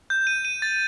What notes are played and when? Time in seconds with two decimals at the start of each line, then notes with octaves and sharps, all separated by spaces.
0.10 G6
0.27 D#7
0.45 D#7
0.62 A6